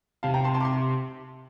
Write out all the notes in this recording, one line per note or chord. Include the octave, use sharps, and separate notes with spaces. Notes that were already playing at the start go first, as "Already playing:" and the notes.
C3 F5 A5
G5 A#5
A5 C6
A5 C6
D6
C6